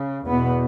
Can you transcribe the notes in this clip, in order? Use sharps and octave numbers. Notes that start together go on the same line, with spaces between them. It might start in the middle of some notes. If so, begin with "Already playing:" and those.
Already playing: C#3
E2 B2 B3